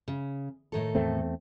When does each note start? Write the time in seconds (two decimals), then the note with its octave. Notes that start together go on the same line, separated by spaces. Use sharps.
0.08 C#3
0.72 A2 D#3 A4
0.95 E2 A3 C4